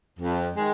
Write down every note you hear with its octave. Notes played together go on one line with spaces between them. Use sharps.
F2
D#3 G#3